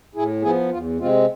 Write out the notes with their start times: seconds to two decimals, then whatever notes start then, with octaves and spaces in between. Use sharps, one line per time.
0.15 A2 E4 G#4
0.42 F3 B3 E4 G#4
0.70 E2 F4
0.98 C3 G#3 C4 F4